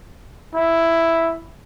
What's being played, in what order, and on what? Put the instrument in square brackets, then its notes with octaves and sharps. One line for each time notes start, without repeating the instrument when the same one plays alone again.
[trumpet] E4